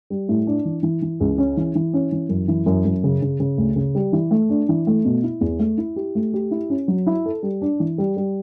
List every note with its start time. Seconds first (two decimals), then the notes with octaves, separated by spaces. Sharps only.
0.10 G3
0.29 A2
0.47 D4
0.65 E3
0.83 E3
1.02 E3
1.20 C#2
1.38 C#4
1.57 E3
1.75 E3
1.94 C#4
2.12 E3
2.29 F#2
2.48 E3
2.66 F#2
2.85 F#2
3.04 C#3
3.22 C#3
3.40 C#3
3.58 D2
3.76 C#3
3.95 G3
4.13 E3
4.31 A3
4.49 D4
4.69 E3
4.87 A3
5.05 B2
5.23 E4
5.41 E2
5.59 A3
5.78 E4
5.96 G4
6.15 A3
6.34 G4
6.51 E4
6.70 C#4
6.88 F#3
7.07 E4
7.25 A4
7.43 G3
7.62 D4
7.80 E3
7.98 G3
8.17 G3